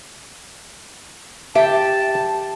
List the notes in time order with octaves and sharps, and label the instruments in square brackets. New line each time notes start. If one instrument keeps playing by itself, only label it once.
[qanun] G4 [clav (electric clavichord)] E5 [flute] A5